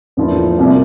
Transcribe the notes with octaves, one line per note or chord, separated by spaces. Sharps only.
E2 D3 F3 A#3 E4
C2 C3 G3 A#3